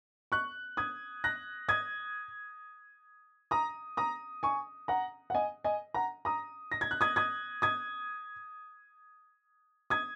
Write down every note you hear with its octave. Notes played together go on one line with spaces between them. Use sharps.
C#6 F#6
D#6 G#6
F#6 A#6
D#6 G#6
A#5 D#6
A#5 D#6
G#5 C#6
F#5 A#5
F#5
D#5 G#5
D#5 G#5
F#5 A#5
A#5 D#6
A#6
G#6
F#6
D#6 G#6
D#6 G#6
D#6 G#6
D#6 G#6